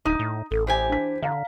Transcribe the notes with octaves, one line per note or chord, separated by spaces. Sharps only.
D1 D#4 D#6
A2
A1 A4
E3 G4 C5 G#5
D4 B6
D3 F5 A#5